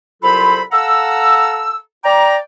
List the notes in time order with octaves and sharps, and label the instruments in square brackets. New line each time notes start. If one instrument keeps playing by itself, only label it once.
[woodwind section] C2 F#3 F4 A4 C5 B5
A4 F5 F#5 A#5 E6
D5 G5 A#5 D6